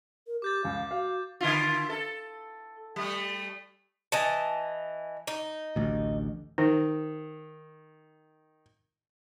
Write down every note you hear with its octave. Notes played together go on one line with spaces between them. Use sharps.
A#4
G4 D6 G6 A6
C#2 F5
F#4 F5
D3 E4 F4
A4
G3 A3
E3 D#5 A5
D#4
A1 D2
D#3 D#4 C5